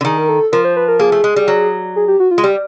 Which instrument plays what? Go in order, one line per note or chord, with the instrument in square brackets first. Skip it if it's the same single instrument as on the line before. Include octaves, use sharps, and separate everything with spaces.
[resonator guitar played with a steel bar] D3
[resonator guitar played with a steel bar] D#3 [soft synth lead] G#4
[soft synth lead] A#4
A4
[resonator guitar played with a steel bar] F3 [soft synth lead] A#4
[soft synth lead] C5
B4
A#4
[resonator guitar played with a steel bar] A#3 [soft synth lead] G#4
[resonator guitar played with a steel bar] A3
G#3
G3
F#3
[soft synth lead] G#4
G4
F#4
F4
[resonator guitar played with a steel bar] G#3
[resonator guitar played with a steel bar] G3 [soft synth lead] G4